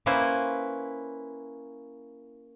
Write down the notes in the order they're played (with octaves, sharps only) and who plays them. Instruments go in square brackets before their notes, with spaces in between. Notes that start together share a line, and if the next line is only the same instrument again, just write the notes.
[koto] A#3 C#4 E4 B4 C5